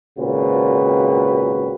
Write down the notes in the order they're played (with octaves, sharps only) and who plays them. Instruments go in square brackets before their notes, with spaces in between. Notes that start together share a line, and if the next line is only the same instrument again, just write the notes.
[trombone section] G#1 A#2 C#3 C4 F#4 B4